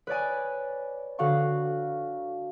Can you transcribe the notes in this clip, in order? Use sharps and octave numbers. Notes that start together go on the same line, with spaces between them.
B4 C#5 D5 G#5
D3 F#4 F5 C#6